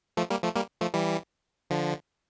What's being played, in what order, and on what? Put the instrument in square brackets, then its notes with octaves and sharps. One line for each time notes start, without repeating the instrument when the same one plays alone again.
[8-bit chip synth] F3 A3
G3 A#3
F3 A3
G3 A#3
F3 A3
E3 G3
D3 F3